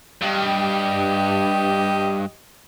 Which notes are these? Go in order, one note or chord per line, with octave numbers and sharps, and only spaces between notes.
G2 G4 D#5